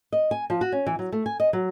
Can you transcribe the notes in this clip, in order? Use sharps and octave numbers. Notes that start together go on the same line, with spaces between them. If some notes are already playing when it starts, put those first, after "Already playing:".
D#5
G#5
F3
F#4
C#4
E3
F#3
A3
G#5
D#5
F#3